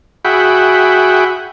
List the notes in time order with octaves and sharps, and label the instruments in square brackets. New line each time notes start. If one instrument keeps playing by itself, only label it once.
[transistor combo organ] F#4 G#4 E5 F#5 G5 B5